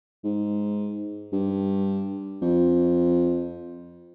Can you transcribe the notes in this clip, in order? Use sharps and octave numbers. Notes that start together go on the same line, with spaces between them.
G#2
G2
F2